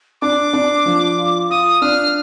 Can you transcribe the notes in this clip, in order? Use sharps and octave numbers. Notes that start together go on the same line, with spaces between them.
D4 D6
D4
F3
F4
F4 D#6
D4 F6